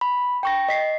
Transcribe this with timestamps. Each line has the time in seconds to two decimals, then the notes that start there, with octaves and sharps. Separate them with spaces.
0.01 B5
0.43 G5 C#6 A#6
0.69 D#5 B6 C7